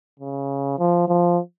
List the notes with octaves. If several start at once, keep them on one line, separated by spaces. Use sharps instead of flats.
C#3
F3
F3